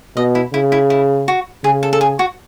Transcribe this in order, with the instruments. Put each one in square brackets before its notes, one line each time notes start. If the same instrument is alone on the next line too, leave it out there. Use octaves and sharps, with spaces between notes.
[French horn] B2 [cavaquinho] D#5
[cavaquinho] E4
[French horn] C#3 [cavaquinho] E4
[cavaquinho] E4
E4
F#4
[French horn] C#3 [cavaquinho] G#4
[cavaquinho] A4
A4
G#4
F#4